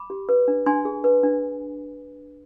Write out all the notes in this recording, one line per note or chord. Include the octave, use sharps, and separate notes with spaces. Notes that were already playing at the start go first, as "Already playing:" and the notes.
Already playing: B5 D6
G4
B4
D4
D4 G#5 C6
G#4
B4
D4